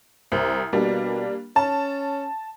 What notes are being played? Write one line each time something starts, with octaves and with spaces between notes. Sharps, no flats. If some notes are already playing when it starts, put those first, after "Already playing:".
C2 C5
B2 G3 A#3 D4
C#4 A5